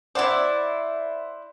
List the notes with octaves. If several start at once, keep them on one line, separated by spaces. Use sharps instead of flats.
E4 C5 D5 F#5